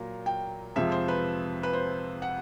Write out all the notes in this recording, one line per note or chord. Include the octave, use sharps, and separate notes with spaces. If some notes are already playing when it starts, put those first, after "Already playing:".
Already playing: A#2 F#3 A#3 A#5
G5
F2 C3 F3 G#3 E5
C5
B4
B4
C5
F#5